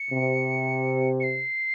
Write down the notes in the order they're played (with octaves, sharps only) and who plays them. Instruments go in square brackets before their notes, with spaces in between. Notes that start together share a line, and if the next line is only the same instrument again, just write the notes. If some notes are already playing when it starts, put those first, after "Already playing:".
Already playing: [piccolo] C#7
[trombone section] C3
[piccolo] C#7
C7